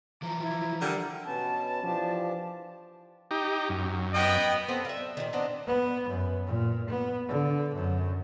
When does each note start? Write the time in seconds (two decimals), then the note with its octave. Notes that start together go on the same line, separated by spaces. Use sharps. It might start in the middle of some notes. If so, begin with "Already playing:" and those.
0.22 E3 F3 A#5
0.42 E4
0.82 D3 G3 A#4
1.25 B2 B3 C#4 A5
1.84 E3 F3 D4 G4
3.31 D#4 G4
3.69 F#2
4.13 B3 D#5 G5
4.68 B3 C4 A4
4.85 E5 F5
5.17 A#2 D#3
5.33 B3 C4 D4 D#4
5.67 B3
6.09 F#2
6.47 A#2
6.89 B3
7.29 D3
7.75 F#2